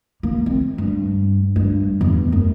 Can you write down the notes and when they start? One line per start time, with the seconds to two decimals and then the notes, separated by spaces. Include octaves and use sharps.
0.23 A#3
0.46 C4
0.78 G2
1.56 G2
2.01 E2
2.32 F#2